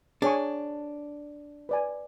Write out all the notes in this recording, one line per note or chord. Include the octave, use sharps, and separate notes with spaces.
D4 G#4 C#5 G#5 C#6
B4 D5 G#5